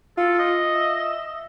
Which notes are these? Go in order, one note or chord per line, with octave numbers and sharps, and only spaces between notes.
F4 A4
D#5
E5